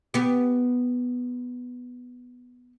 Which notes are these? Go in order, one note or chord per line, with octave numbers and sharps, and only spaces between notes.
B3 G4